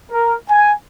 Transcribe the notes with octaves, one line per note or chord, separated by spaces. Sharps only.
A#4
G#5